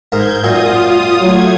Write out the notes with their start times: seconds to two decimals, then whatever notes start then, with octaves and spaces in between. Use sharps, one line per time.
0.12 G#2 A#3 G6 G#6
0.44 F#2 A#2 F4 D#6
1.21 F#3 A3 G#6